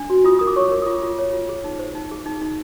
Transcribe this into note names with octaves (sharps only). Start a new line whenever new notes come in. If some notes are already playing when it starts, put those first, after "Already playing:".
Already playing: D4
F#4
F4 D#6
A#4 D#6
D6
C#5 C#6
A#4
D#6
F4 D6
F4
C#5
F4
G#4
D#4
C5
D#4
G#4
D#4
D#4